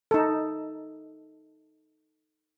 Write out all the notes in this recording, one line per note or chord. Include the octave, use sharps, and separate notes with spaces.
D#4 A4